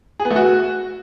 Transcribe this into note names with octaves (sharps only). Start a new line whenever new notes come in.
G#4
B3
A3
F#4